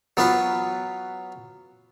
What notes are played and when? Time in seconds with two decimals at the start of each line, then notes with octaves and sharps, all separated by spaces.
0.17 F#3 B3 F4 B4